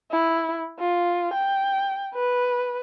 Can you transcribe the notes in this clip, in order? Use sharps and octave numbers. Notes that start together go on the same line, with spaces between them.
E4
F4
G5
B4